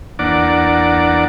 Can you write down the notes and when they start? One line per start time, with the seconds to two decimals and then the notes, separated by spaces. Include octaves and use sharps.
0.19 E2 A#3 D4 D5 F#5 D6